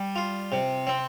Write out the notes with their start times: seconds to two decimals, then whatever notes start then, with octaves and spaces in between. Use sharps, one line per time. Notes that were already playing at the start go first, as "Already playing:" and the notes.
Already playing: G3
0.16 F4
0.52 C3
0.87 C4